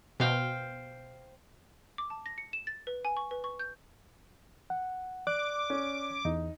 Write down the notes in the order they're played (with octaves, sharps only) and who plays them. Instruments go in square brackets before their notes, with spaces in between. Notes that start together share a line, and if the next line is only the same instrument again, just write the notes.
[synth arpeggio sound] B2 [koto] C5 F5 G5
[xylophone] D6
A5
A#6
C#7
E7
A6
B4
G#5
C#6
B4
C#6
G6
[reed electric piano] F#5
[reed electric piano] D5 F#6 [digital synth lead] D6
[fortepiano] C#4
[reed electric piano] E2 [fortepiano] D#4